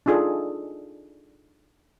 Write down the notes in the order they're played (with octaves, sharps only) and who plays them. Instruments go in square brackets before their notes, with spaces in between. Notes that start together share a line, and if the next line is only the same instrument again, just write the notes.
[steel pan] D4 D#4 F4 G#4 A4